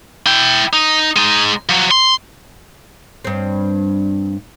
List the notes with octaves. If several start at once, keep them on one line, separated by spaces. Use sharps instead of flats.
E4 G5
D#4
G#3 D#4
F3 F#3
C6
G2 C4